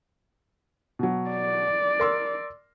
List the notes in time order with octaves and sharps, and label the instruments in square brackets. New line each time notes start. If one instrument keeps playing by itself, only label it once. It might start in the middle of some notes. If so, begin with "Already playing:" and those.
[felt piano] B2 F#3
[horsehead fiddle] D5
[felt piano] A#4 C6 E6